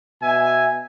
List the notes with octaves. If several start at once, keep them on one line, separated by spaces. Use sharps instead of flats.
B2 E5 G#5